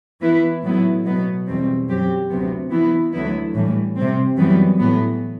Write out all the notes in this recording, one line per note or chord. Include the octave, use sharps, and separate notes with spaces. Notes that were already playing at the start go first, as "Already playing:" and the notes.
E3 B3 E4 B4
A2 F#3 B3 E4
B2 F#3 B3
E2 B2 G3 C4
F#2 F#3 C4 G4
D2 C3 F#3 B3
E3 B3 E4
D2 D3 F#3 B3 E4
A2 E3 G3
C3 G3 C4
F#2 E3 G3 B3
A2 E3 B3